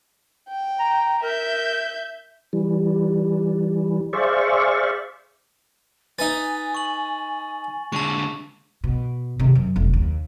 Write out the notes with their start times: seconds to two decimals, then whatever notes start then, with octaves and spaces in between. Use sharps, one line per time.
0.49 G5
0.80 A#5
1.23 A#4 E5 G6
2.53 E3 G3
4.13 G#4 C5 D5 E5 F5 C#6
6.19 D#4 B4 G#5 A6
6.74 C#6 F#7
7.93 D3 G#3 A5 C#6
8.84 B2
9.39 C3 D#3
9.55 F#2
9.76 F1 B1
9.93 D#2